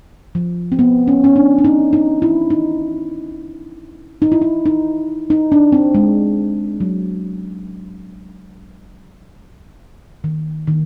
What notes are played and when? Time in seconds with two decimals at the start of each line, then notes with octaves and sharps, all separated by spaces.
0.35 F3
0.72 C4
0.79 B3
1.08 C#4
1.24 C#4
1.36 D4
1.59 D4
1.65 D#4
1.93 D#4
2.22 E4
2.50 D#4
4.22 D#4
4.32 E4
4.42 D#4
4.65 D#4
5.30 D#4
5.52 D4
5.72 C4
5.95 G#3
6.80 F#3
10.24 D#3
10.67 D#3